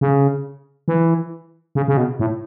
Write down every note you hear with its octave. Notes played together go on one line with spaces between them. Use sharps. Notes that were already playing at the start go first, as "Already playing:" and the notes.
C#3
E3
C#3
C#3
B2
A2